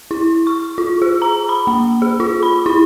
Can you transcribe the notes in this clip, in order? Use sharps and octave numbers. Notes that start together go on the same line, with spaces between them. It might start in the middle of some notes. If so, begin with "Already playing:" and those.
E4
C#6
F4
G#4
A#5
B5
A#3
G#4
F4
B5
E4